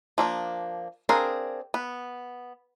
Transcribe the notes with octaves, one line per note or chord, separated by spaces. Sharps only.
F3 A#3 D4
C4 D4 G#4 A#4 F5
B3